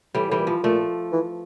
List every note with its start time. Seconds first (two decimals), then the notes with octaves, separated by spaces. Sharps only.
0.15 A2 E3 G3
0.29 A2 E3 G3
0.39 A#2
0.47 F3
0.63 A#2 F3 A3
1.12 E3